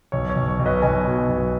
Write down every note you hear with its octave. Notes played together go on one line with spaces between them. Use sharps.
B1 C#5
C#5
B1
C#5
B1
B4 D#5
B1 D#5 G#5
B2
B1